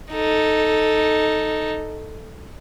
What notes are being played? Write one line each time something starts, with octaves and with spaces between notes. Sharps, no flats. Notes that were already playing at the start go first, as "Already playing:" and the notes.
D#4 A4